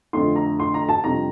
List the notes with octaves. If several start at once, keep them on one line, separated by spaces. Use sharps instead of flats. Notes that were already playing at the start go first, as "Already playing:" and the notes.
F2 D3 A3 D4 F4 C6
A#5
C6
A#5
A5
F2 C3 G3 D4 F4 A#5